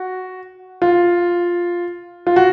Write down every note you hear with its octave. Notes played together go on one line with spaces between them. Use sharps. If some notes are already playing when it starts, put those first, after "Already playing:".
Already playing: F#4
F4
F4
F#4